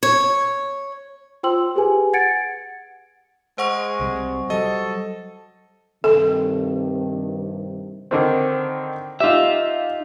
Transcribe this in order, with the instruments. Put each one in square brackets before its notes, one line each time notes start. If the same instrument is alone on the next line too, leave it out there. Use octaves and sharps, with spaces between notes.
[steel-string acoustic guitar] C#5
[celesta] F4 C5 G5 C6 E6 F#7
G4 G#4 B4 G#5
F#5 G#6 A6 C#7 D7
[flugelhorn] G#3 [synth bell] C5 F#5 C#6
[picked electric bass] C2 C3 G3
[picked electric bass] F#3 G3 [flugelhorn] A4 [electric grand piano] D#5
[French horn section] G2 C3 D#3 [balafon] A4
[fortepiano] D3 D#3 C4
[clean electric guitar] D#4 E5 [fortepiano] F4 G4